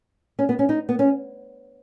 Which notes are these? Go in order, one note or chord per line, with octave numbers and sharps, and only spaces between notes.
C#4
B3
C#4
D#4
B3
C#4